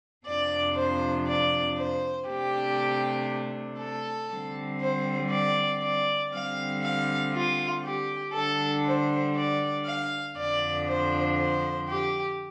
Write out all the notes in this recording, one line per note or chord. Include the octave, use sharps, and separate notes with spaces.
F2 C3 F3 D4 D5
C5
D5
C5
C3 A3 D4 G4
A4
D3 G3 C4
C5
D5
D5
D3 G3 C4 F5
F5
F4
G4
D3 G3 D4 A4
C5
D5
F5
F2 D3 F3 D4 D5
C5
C5
G4